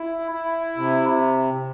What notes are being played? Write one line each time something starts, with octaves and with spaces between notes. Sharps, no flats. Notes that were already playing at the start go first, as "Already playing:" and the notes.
Already playing: E4
E4
C3